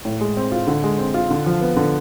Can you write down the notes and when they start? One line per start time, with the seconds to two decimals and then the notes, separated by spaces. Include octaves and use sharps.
0.05 A2
0.21 G#3
0.37 C4
0.52 F4
0.67 D3
0.84 G#3
0.99 C4
1.14 F4
1.31 D3
1.46 F3
1.61 B3
1.77 D3